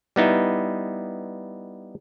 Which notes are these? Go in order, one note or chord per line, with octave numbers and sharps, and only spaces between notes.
G3 B3 D#4 E4